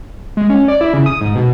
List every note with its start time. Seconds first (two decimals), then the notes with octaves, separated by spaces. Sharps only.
0.37 G#3
0.50 C#4
0.68 D5
0.81 E4
0.93 C#3
1.06 D#6
1.21 G#2
1.35 B2